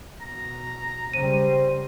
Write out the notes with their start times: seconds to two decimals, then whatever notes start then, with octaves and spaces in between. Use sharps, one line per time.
0.21 B2 A#5
1.14 C#3 G3 C5 D#7